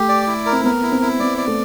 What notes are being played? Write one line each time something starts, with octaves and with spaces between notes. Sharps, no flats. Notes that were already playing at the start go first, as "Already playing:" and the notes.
Already playing: A3 G4
D5
E4
A#4
C4
B3 A#4
E4
C4
E4
B3 D5
D5
A3